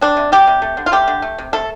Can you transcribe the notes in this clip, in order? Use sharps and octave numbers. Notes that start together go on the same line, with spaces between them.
G3 D4
C3
G3 G4
C3
A3
D3
F4
A3 G4
D3
A3
C3
A3 A4